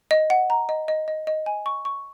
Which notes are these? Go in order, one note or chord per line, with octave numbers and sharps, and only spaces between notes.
D#5
F#5
A#5
D#5
D#5
D#5
D#5
G#5
C#6
C#6